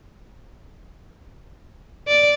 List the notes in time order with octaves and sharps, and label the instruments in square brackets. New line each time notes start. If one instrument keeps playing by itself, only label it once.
[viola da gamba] D5